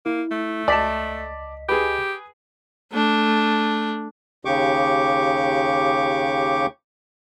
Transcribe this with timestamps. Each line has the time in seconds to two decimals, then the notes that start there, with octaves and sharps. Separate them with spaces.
0.06 A#3 E4
0.31 A3
0.68 C#2 D5 D#5 A5 B6
1.69 G4 G#4 B4
2.93 A3 D4
4.45 D#2 C#3 G4 C#6 D6